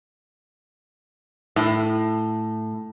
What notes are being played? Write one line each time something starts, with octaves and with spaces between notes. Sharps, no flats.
A2